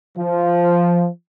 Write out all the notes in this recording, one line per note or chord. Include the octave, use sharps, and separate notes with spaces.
F3